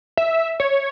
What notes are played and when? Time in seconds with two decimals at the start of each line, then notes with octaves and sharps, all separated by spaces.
0.17 E5
0.60 C#5